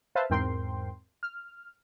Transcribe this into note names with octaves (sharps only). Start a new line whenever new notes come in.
B4 C5 E5 F5 A5
E2 G#2 C4 A#4 G5 C6
F6